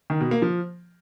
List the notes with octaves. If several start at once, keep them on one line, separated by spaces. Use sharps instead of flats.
D#3
B2
A#3
F3